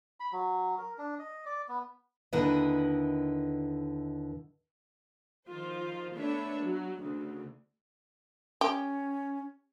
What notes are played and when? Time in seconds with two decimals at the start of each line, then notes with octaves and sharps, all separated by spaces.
0.20 B5
0.32 F#3
0.78 A#4
0.98 D4
1.19 D#5
1.46 D5
1.69 B3
2.33 D#2 D3 E4 A#4 B4 D#5
5.48 D#3 F3 F4 C5
6.16 A3 B3 D4 B4 C#5 E5
6.61 F#3
7.00 D2 C#3
8.61 C#4 G4